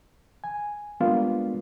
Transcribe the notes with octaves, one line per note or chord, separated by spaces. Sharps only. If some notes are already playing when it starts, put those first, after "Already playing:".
G#5
G3 G#3 A#3 B3 D4 F4